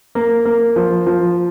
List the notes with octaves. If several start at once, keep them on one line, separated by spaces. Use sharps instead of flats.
A#3
A#3
F3
F3